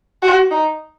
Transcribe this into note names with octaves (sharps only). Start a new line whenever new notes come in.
F#4
D#4